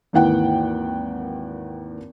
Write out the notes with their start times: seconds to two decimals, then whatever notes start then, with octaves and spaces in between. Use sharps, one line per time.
0.13 G#1 D#2 E3 F#5 G5